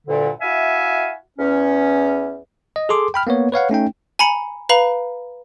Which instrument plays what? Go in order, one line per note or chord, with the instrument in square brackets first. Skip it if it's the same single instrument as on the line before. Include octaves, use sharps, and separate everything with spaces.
[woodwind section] D2 G2 A#2 D3
E4 F#4 E5 F5 G#5
E2 C#4
[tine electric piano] D#5
G#4 A4 C6 D6
G5 B5 F6
A#3 B3 C#5
B4 C#5 F5 F#5
A3 C#4 D#4 G5
[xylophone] G#5 A#5 B5 C#7
B4 F5 A#5 B5 F#7